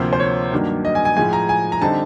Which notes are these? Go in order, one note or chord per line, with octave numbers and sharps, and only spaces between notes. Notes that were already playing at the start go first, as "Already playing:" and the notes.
Already playing: D2 C3 F3 A#3 C5
C5
C#5
G2 D#3 F#3 A#3 D4
D#5
G#5
G#5
A2 F3 G#3 G#5
A#5
G#5
A#5
D3 G3 C4 D#4 A5